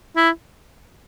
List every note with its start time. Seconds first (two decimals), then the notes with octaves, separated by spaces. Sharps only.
0.17 E4